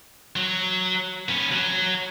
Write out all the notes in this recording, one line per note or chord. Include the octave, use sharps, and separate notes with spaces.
F#3
B3 C#4
F#3